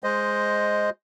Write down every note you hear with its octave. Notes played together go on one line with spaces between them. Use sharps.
G#3 C5 D#5